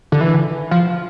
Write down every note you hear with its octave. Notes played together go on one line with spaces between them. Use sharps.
D3
E3
F3